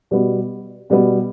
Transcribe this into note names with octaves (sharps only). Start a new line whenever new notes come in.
B2 G3 B3
B2 G3 B3